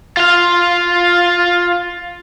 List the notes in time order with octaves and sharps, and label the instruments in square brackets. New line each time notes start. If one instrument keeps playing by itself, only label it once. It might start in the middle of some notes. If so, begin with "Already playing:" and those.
[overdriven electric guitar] F4 F5